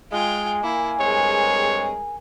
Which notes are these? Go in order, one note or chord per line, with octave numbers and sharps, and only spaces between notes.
G#3 F4 G5 G#5
A#3 E4
G2 G#3 C4 G#4 A#4 C#5